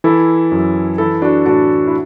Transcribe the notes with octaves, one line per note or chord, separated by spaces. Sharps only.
E3 E4 A4
F#2
E3 E4 A4
D4 F#4
A2 D4 F#4
E4